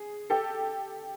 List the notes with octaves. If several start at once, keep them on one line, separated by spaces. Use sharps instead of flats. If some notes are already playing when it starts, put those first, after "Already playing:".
Already playing: G#4
G4 A4